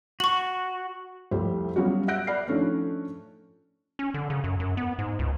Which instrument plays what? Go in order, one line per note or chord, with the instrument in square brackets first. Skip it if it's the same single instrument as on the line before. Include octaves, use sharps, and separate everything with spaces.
[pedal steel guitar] F#4 [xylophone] C#6 F#7
[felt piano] C2 F2 A3 G4 C5
F#3 G3 B3 C#4 F4 F#4
E5 F#5 F#6 G6 A#6 D7
D5 F#5 B5 F6 C7
D#3 F3 A3 C#4 D4
[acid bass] C#4
D3
C#3
F#2
F#2
B3
G#2
C#2